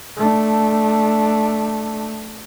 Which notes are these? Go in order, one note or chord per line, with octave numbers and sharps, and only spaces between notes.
A3 D4